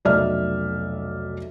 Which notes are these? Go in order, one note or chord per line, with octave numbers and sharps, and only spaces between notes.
F1 B1 D5 E5 F6